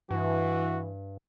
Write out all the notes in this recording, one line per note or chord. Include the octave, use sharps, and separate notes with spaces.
G2 E3 F#4